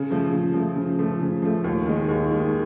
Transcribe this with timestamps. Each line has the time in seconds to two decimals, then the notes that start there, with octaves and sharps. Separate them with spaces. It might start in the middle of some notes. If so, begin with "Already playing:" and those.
Already playing: C#3
0.10 F3 A3
0.32 C#3
0.54 F3 A3
0.76 C#3
0.99 F3 A3
1.21 C#3
1.42 F3 A3
1.64 D#2
1.86 D#3 G#3
2.09 D#2
2.30 D#3 G#3